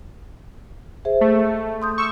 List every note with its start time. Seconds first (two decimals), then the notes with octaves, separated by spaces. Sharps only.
1.05 G#4 C5 E5
1.21 A3
1.82 C6 D#6 G6
1.98 C#6 E6